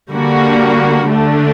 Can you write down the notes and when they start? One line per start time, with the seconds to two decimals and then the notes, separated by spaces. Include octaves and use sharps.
0.12 D3 G3 A#3 F#4
1.08 D3 A3 D4